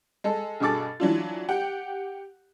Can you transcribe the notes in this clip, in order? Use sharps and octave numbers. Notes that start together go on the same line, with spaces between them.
G#3 A4
G2 B2 G#4 A4 D6 A6
E3 F#3 D4 F4
G4 F#5 G5